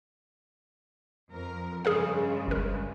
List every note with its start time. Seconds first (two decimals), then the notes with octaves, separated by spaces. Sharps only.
1.30 F2 A#4
1.85 G2 C#3 G#3 G#4 A#4 F5
2.47 G1 A#4